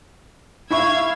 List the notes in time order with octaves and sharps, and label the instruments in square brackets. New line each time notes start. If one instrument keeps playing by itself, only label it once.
[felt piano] E4 E5 C#6 [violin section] F5 E6 G#6